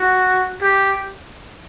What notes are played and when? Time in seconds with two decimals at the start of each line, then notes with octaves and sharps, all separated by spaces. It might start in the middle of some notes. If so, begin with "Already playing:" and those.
Already playing: F#4
0.62 G4